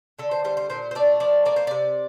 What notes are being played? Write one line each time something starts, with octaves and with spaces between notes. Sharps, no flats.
D3 A4
C5
G3 C5
C5
A#2 C5
C5
A3 D5
F3 D5
A#3 D5
C5
C3 D5